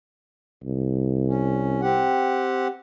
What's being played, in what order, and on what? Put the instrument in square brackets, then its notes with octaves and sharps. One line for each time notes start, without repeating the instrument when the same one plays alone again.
[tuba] C2
[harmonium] C#4
C4 G4 F#5